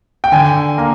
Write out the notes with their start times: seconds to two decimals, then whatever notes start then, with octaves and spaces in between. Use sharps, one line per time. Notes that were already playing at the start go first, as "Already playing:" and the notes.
0.24 G5
0.32 D3 G#5
0.78 A#3